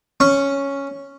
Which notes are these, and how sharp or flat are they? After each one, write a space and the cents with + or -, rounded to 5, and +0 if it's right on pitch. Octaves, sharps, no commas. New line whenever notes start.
C#4 +0 C#6 +0